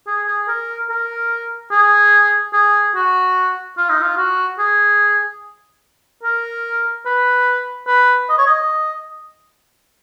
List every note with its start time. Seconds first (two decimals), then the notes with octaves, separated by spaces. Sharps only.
0.07 G#4
0.27 G#4
0.48 A#4
0.89 A#4
1.71 G#4
2.53 G#4
2.95 F#4
3.77 F4
3.90 D#4
4.02 F4
4.18 F#4
4.59 G#4
6.23 A#4
7.06 B4
7.88 B4
8.29 D#5
8.38 C#5
8.47 D#5